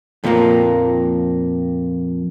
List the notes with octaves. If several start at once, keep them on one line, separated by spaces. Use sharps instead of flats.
F2 A#2 F3 G3 A#3